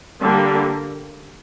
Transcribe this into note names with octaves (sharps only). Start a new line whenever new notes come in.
D3 G3 A#3